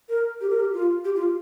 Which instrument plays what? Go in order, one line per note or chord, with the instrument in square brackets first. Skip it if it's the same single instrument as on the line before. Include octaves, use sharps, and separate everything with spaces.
[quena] A#4
G4
A#4
G4
F4
G4
F4